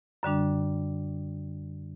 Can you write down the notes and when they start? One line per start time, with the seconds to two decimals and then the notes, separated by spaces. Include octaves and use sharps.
0.23 F#2 D3 G3 D4